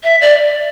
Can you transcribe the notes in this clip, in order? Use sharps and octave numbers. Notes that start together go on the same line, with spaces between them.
E5
D5